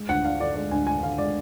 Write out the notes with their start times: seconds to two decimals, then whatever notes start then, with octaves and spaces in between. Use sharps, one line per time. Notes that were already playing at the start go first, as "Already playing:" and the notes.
Already playing: G#3
0.09 D2 F#5
0.24 D4 F5
0.40 D3 D5
0.56 G#3 D5
0.71 D2 G#5
0.87 D4 G#5
1.03 D3 F5
1.18 G#3 D5